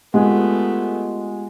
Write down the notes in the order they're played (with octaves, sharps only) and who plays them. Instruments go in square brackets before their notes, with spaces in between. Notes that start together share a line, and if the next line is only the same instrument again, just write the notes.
[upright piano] G#3 [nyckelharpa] A3 B3 [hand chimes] F4 G4 F#5